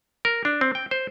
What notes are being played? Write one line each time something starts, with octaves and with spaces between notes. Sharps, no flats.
A#4
D4
C4
G5
C5